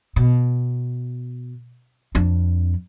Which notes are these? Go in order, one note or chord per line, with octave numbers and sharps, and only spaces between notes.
B2
F2 D4